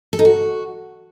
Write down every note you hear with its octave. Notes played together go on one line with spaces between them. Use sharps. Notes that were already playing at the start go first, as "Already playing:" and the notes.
A4
D#4
F#4